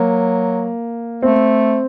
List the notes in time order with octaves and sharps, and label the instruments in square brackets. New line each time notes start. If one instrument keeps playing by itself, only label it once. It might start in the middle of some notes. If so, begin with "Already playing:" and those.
Already playing: [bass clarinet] F#3 [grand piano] A#3
[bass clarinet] A3 [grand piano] C4